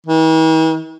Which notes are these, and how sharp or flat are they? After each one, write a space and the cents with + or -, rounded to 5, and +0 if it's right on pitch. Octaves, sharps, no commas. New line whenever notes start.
E3 -45